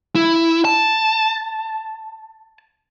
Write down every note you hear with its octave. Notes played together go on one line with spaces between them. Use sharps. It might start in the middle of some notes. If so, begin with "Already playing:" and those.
E4
A5